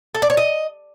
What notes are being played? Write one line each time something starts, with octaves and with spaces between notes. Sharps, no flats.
A4
D5
C#5
D#5